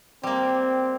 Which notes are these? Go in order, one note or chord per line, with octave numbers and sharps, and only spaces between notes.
G3 A#3 C4